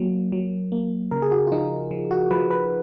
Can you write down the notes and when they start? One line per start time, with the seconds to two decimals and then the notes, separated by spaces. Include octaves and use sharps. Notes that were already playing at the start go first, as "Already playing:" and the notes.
Already playing: F#3 A#3
0.32 F#3
0.72 A#3
1.11 C#3 A#4
1.22 G#4
1.32 F#4
1.47 F4
1.52 F3 D#4
1.91 F3
2.11 F#4
2.31 F3 B4
2.51 B4